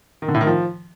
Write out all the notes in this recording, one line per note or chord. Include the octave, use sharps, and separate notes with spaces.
D#3
D3
A2
D#3
F3